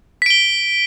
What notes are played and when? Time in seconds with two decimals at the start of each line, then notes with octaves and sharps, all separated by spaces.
0.22 B6
0.26 D7
0.30 G7